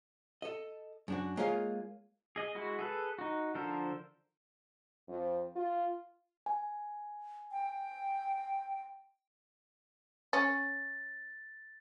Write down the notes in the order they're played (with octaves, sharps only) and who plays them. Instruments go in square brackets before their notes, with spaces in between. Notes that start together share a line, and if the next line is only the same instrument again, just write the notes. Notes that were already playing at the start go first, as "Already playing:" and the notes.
[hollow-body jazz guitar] A4 D#5
F#2 D4 F#4
G#3 A#3 F4 C#5 D#5 F5
[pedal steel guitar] G#4 D#5
G#3 E4 F#4
G#4 A4 B4
D#4 F#4
D3 F3 A4 A#4 C5
[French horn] F2
F4
[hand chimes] G#5
[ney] G5
[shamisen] C#4 [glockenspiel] A6